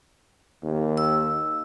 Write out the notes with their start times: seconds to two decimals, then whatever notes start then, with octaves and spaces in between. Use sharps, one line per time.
0.63 D#2
0.97 E6